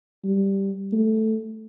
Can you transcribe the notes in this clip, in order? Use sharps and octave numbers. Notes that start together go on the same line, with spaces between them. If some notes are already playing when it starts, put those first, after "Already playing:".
G3
A3